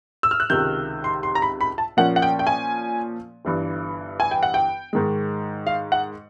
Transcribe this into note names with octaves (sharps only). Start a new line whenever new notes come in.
E6
F6
F#6
C#2 C3 D#3 G6
C6
C6
A#5
B5
B5
A5
A#2 F3 A#3 C#4 F#5
F#5
G5
G5
G#5
G1 G2 E3
G#5
G5
F#5
G5
G#2 D#3 G#3
F5
F#5